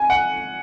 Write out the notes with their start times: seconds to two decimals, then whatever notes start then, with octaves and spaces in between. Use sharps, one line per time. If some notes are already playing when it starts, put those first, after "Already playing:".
Already playing: G#5
0.10 F#5